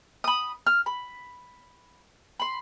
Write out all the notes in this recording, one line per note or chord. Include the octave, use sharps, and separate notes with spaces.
B5 D#6
F6
B5
B5 C6